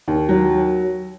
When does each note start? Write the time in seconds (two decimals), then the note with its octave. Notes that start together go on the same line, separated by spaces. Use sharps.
0.08 D#2
0.29 F#3